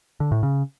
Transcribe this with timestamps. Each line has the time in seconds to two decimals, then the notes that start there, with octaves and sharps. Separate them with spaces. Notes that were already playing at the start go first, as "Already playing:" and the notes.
0.20 D3
0.32 A2
0.43 C#3